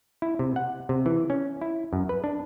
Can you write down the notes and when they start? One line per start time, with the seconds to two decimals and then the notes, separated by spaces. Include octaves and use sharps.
0.22 E4
0.39 C3
0.56 F#5
0.89 C3
1.06 E3
1.30 C#4
1.61 E4
1.93 F#2
2.09 B4
2.24 D4